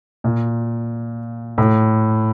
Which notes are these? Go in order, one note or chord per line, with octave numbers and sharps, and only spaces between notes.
A#2
A2